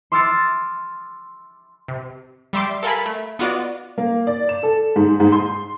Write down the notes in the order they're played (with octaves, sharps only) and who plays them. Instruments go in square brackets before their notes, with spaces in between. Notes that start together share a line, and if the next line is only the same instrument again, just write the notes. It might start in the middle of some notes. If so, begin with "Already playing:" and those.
[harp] C6 D6 E6 F6 A6 C#7
[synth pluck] C3
G3 E5 C6 D6
A4 A#4 F5 G#5 B5
A3
B3 F4 F#4 D5 D#5
[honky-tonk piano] A#3
D5
E7
A4
G#2
G#2
C6